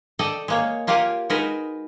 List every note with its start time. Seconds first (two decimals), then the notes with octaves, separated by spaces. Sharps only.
0.19 A4 D5 D#5 G5 A5
0.48 G#3 A#3 C#5
0.87 A#3 F4 G4 A#4 F#5 G#5
1.30 G#3 D#4 F#4 A#4 B4 D#5